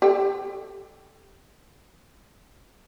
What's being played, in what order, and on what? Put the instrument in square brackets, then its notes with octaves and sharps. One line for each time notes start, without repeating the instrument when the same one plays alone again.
[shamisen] G4 A4 G5